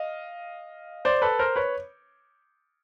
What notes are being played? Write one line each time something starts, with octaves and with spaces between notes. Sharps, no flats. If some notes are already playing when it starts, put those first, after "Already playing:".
Already playing: D#5 F5
C5 D5
A4 B4
A#4 C5
B4 C#5